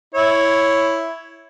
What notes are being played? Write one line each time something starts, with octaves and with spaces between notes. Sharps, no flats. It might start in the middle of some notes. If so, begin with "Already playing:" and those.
E4 C#5